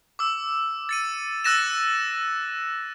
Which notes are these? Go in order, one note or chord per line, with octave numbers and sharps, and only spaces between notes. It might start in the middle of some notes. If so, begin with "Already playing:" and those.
D6 E6
A6 C#7 D#7
E6 F#6 A6 A#6 D#7 E7